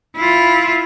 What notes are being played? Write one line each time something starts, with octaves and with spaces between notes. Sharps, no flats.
E4 F4